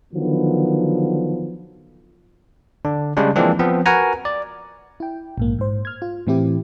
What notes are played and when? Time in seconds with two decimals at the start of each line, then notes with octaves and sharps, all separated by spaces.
0.14 D3 D#3 F3 F#3 B3
2.85 D3 D4
3.17 C#3 G3 G#3 D4
3.36 E3 F3 G#3 A#3 C4 D4
3.59 F3 B3 C4
3.86 F#4 A#4 B4 F#5 G#5 A#5
4.25 D5
5.00 E4 G5
5.38 A#1 G#2 A#3
5.59 G#2 C5
5.85 F6 G#6
6.02 F4
6.27 A2 E3 C4 E4 G4